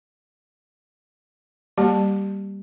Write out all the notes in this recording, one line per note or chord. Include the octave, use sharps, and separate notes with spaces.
G3 A#3 G4 A5